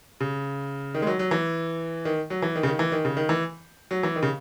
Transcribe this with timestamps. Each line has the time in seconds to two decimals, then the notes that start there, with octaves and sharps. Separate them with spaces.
0.21 C#3
0.94 D#3
1.02 G#3
1.07 F#3
1.19 F#3
1.31 E3
2.05 D#3
2.30 F#3
2.42 E3
2.56 D#3
2.63 C#3
2.67 D#3
2.79 E3
2.92 D#3
3.05 C#3
3.17 D#3
3.29 E3
3.91 F#3
4.03 E3
4.16 D#3
4.23 C#3